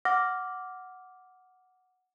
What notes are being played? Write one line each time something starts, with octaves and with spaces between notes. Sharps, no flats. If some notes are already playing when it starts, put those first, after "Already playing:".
F#5 D6 F6 A#6